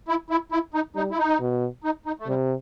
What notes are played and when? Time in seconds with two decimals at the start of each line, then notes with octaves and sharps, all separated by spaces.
0.08 E4
0.30 E4
0.52 E4
0.74 D#4
0.96 G3 D#4
1.11 E4
1.18 D#4
1.40 B2
1.84 D#4
2.06 D#4
2.20 A3
2.27 C3 G3